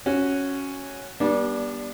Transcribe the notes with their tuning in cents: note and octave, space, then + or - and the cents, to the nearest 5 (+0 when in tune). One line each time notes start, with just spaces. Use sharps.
C#4 +0 F#4 +0
G3 +0 B3 -45 D4 -10